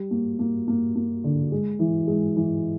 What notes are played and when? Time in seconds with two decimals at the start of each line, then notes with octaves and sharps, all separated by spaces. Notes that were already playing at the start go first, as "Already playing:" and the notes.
Already playing: G3
0.11 A#3
0.39 A#3
0.68 A#3
0.95 A#3
1.24 D3
1.52 G#3
1.79 E3
2.07 G#3
2.36 E3